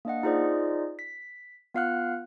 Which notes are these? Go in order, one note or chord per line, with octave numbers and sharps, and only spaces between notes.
A#3 D4 D#5 F#5
D#4 F4 G#4 C5 D5 D#5
B6
B3 F4 F5 F#5 F6 F#6